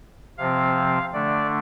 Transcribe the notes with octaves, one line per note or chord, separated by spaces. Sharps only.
C3 F3 C4 F5
D3 A3 D4 D5